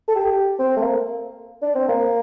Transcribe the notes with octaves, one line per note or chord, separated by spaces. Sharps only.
A4
G4
C4
A3
A#3
D4
C4
A#3